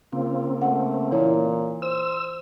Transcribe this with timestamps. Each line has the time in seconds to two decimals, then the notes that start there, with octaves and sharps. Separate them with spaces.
0.13 C#3 A#3 C4 F4
0.62 A3 F#5
1.11 A#2 E3 E4 C#5
1.82 C5 E6